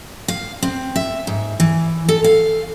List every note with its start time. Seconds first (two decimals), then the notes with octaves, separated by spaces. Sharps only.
0.28 F5
0.62 C4
0.96 E5
1.27 G#2
1.60 E3
2.09 A4
2.24 F5